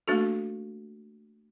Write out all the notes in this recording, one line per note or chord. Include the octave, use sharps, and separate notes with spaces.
A3 A#3 D4 F#4 A4